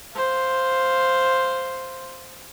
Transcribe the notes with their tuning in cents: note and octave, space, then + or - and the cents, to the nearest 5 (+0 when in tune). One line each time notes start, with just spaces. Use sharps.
C5 +0 F5 +0